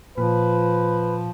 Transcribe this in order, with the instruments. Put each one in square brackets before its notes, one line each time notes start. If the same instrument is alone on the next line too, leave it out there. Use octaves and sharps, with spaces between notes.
[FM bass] A#2 [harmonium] F3 [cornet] B4